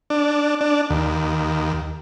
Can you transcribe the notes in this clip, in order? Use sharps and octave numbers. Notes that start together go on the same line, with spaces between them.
D4
D4
D#2